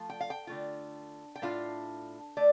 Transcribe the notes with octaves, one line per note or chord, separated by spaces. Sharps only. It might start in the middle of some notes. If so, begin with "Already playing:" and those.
Already playing: F3 A3 F4
G5
F5
G5
D3 A3 F4
G5
A2 A3 D4 F4 F5
A3 D5